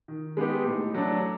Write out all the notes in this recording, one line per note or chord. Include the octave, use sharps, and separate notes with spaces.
D#3
G#3 B3 D#4 G4
A2
F#3 A3 D4